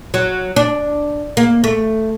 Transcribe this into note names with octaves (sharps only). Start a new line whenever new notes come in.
F#3
D4
A#3
A3